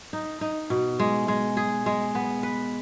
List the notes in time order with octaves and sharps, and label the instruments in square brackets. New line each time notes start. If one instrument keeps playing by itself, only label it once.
[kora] D#4
D#4
B2
G#3
G#3
G#4
G#3
B3
B4